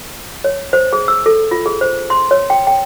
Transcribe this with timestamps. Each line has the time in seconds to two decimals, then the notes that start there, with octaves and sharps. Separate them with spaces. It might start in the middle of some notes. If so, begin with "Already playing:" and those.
0.44 C#5
0.73 C5
0.93 G#4
1.08 E6
1.26 A4
1.51 F4
1.66 G#4
1.81 C5
2.10 C6
2.31 C#5
2.50 G5
2.67 G5